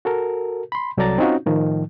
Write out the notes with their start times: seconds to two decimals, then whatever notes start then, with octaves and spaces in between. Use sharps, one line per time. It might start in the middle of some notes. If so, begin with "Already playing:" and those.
0.05 F#4 A4 A#4
0.72 B5 C6
0.97 C2 F#3 A4 D5 A#5 A6
1.18 C4 C#4 D#4 F4 F#4
1.46 A2 D#3 F3